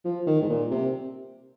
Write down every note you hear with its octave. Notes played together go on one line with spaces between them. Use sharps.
F3
D#3
G#2
A#2
C3